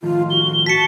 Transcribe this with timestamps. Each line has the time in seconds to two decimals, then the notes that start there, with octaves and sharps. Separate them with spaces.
0.03 A2 D#3 F3 F4
0.30 F#4 G7
0.66 F#4 A5 B6 C#7